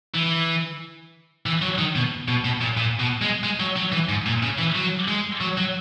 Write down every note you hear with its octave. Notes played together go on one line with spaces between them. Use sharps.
E3
E3
F#3
D#3
B2
B2
B2
A#2
A#2
B2
G#3
G#3
F#3
F#3
E3
G#2
A#2
C#3
E3
F#3
G#3
F#3
F#3